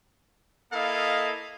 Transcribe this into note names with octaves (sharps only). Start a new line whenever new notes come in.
A#3 E4 A4 D#5 F5